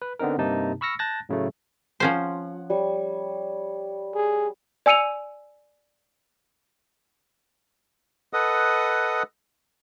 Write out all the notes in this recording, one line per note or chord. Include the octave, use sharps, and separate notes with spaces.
B4
D3 B3 C4 D#4 A#4
G2 C3 A#3 D#4 A5
B5 C#6 E6 F6 A#6 C#7
A5 F#6 G6 A6 A#6
A2 C#3 F#3 A3
F3 C#4 C5 F#5
G3 C#5 C#6
G#4
D5 G#5 E6 C#7 D#7 F7
A4 B4 D#5 F#5 D#6